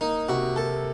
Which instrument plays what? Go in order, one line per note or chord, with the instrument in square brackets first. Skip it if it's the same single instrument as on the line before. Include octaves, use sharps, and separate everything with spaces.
[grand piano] A#3 [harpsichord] D#4
[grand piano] C3 [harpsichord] F#4
[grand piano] A#3 [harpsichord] A4